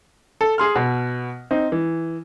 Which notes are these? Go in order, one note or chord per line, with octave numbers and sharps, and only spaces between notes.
A4
G#4 C6 F6
B2
C4 D#4
E3